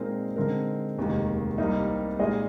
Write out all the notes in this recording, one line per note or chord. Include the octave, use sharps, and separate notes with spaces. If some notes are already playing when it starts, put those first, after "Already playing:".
Already playing: A#2 G#3 C4 D#4 A#4
D3 G#3 C4 D#4 A#4
F1 D#2 D#3 G#3
C2 C3 G3 A#3 D#4
A#2 G#3 D#4 G#4 D#5